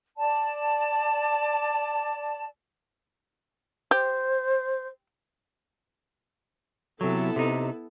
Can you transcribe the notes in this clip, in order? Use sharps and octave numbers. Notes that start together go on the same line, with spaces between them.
D5 A5
G4 C5
C3 F#3 B3 E4 A4
C3 D#4